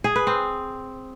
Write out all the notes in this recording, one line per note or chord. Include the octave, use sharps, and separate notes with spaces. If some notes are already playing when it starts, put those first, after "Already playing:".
G#4
B4
C4